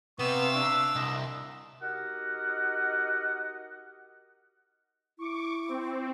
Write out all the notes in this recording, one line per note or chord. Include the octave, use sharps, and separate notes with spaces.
C3 B3 F5 C#6 E6
D4 E5
C2 D#5
D#4 F#4 G4 A#4 D#5 F#5
E4 C#6 D6
C4